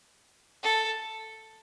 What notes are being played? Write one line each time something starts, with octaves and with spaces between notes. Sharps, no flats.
A4